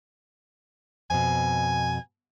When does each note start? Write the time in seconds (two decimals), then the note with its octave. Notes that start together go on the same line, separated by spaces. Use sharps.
1.10 F2 B2 G#5